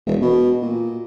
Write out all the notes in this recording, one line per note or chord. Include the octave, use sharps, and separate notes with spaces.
E1
B2
A#2